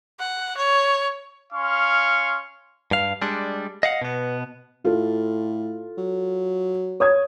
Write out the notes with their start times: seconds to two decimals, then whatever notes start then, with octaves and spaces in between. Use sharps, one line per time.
0.19 F#5
0.57 C#5
1.53 C#4 F5 C6 C#6
2.91 G2 F5
3.22 G3 G#3 D4
3.83 D#5 F5 F#5
4.02 B2 B3
4.85 A2 F4 A4
5.98 F#3
7.00 C#5 D#6 G#6